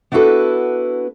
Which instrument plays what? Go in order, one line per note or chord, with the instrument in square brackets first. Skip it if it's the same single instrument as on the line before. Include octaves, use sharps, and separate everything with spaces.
[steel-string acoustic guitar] B3 D4 E4 F#4 A4 B4